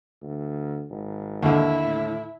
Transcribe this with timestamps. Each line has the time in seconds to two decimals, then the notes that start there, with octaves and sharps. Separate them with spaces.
0.22 D2
0.90 G#1
1.43 D#2 D3 E4
1.84 A2